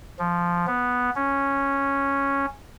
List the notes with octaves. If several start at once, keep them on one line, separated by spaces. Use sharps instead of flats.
F3
B3
C#4